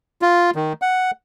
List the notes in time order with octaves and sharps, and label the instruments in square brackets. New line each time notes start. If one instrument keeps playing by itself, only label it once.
[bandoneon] F4
D#3
F#5